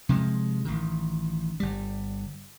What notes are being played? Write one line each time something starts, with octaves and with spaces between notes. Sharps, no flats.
C3 F3 G#3
A1 D#3
G1 G3